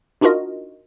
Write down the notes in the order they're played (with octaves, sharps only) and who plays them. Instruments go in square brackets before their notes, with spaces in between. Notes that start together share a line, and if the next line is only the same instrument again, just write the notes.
[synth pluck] D4 D#4 F4 F#4 A#4 D#5